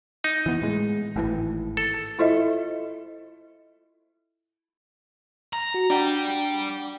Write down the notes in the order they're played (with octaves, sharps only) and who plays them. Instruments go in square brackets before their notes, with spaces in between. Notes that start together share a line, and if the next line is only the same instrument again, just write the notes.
[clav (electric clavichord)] D#4
[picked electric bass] E3 B3
A2 G#3
G#1 A2 E3
[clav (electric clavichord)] A4
[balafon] E4 F4 A4 C5 D#5 E5
[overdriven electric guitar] A#5
[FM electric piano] F#4
[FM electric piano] D4 F#5 [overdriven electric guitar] D5 G5